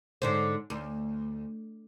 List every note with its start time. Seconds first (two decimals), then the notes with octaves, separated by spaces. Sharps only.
0.22 G#2 D3 C5
0.70 D2